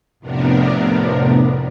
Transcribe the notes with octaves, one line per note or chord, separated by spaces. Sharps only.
F2 A2 C3 B3 D4 A#4